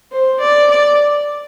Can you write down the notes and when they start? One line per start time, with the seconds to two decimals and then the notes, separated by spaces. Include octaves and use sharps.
0.11 C5
0.40 D5
0.70 D5